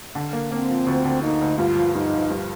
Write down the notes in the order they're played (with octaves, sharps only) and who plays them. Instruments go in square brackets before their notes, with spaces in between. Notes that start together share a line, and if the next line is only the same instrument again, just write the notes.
[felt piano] D3
A#3
[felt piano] A#3 [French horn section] C4
[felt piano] F3
D2
D3
[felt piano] A#3 [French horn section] D#4
[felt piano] D2
[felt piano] G2 [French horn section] F4
[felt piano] F3
[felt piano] G2 [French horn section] D#4
[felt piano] F3
G2